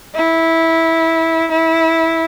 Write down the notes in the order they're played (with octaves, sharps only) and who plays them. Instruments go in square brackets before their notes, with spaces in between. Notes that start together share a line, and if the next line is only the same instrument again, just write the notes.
[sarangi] E4
E4